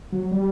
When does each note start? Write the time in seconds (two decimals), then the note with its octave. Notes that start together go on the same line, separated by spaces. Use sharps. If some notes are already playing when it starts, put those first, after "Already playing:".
0.12 F#3
0.31 G3